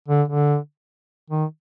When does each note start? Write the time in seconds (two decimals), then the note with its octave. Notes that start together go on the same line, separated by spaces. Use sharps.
0.08 D3
0.28 D3
1.31 D#3